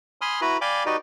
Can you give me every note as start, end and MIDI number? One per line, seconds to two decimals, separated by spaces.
0.21 0.41 80
0.21 0.41 83
0.21 0.41 84
0.21 0.41 87
0.21 0.41 89
0.41 0.57 64
0.41 0.57 66
0.41 0.57 71
0.41 0.57 82
0.41 0.57 83
0.61 0.84 74
0.61 0.84 77
0.61 0.84 79
0.61 0.84 80
0.61 0.84 83
0.61 0.84 86
0.86 0.96 63
0.86 0.96 66
0.86 0.96 67
0.86 0.96 71
0.86 0.96 74
0.86 0.96 75